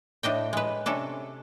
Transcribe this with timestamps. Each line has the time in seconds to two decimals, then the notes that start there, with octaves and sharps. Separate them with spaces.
0.23 A2 D4 D#5 G5
0.53 G#3 B4
0.86 C3 C#4 D4 A4